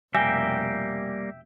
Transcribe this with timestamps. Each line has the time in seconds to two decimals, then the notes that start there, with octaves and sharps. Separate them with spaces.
0.15 F1 B2 G3 A#3 E5 G5 G#5 A#6